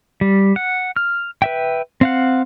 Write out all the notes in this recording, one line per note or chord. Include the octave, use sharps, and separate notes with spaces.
G3
F#5
F6
B4 E5 G5
C4 F5 F#5